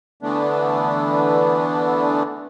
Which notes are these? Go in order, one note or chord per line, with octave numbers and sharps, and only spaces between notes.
D3 E3 A3 B3 D4